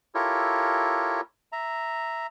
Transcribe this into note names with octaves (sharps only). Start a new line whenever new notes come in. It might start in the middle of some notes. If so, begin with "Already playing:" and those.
E4 F4 G4 A4 A#4 C#5
E5 A#5